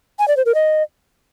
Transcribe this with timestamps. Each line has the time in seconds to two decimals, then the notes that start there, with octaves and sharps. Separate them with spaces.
0.19 G#5
0.28 D5
0.37 C5
0.46 A#4
0.55 D#5